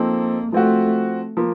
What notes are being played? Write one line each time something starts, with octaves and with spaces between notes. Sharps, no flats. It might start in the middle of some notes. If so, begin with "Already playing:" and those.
Already playing: F3 A#3 C4 D#4 A4
F3 A3 C4 F#4
F3 A#3